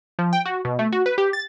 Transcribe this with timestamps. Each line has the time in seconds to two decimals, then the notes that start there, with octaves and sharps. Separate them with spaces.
0.19 F3
0.33 G5
0.45 F#4
0.65 B2
0.79 A3
0.92 F#4
1.06 B4
1.18 G4
1.33 A6